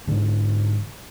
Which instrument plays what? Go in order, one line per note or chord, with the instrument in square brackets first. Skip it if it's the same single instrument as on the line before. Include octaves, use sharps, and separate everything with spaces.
[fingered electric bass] G#2 D3 E3